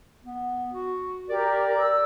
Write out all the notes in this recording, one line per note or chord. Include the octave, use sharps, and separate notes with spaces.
B3
F#4
G4 A#4 D5
E6